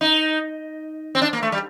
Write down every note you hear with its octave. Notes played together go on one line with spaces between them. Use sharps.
D#4
C4
D4
A#3
A3
G3